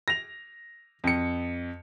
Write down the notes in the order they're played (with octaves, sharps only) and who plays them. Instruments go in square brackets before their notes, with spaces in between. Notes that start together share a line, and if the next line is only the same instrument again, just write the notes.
[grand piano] A#6 F7
F2 C#7